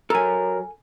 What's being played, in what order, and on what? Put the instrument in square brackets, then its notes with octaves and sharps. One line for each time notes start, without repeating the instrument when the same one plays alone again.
[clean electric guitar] F#3 A#4 [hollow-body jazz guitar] A4 G#5